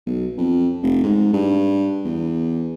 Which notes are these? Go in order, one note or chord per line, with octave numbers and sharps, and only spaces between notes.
B1
F2
F1
G#2
G2
E2